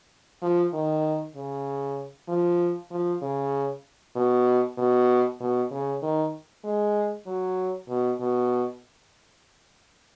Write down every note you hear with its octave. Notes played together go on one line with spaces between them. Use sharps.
F3
D#3
C#3
F3
F3
C#3
B2
B2
B2
C#3
D#3
G#3
F#3
B2
B2